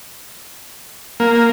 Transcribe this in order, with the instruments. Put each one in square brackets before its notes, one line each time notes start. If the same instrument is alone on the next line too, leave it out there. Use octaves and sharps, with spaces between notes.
[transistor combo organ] A#3